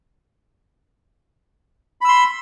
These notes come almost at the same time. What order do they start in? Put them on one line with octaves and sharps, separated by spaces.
B5 E6 C6